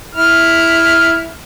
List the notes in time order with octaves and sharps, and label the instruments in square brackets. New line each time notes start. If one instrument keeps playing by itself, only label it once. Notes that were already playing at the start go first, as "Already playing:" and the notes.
[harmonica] E4 F6